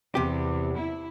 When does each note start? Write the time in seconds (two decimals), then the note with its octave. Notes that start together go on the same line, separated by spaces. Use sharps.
0.15 E2 C3 G4
0.77 E4